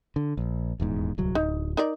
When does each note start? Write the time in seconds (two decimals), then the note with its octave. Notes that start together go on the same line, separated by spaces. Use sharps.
0.16 D3
0.37 A#1
0.80 D#1 E2 G#2
1.18 D1 C2 F#3
1.35 D1 D#4
1.77 D#4 A#4 D5